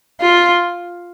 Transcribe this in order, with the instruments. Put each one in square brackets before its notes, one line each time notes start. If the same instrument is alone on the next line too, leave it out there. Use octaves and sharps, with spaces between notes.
[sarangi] F4